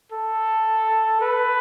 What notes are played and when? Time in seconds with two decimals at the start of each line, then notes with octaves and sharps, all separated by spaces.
0.12 A4
1.21 B4